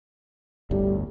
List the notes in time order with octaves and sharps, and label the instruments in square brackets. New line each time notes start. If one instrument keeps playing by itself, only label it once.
[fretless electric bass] G1 D2 A2 [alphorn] G3